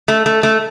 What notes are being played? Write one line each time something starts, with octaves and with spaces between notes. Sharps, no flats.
A3
A3
A3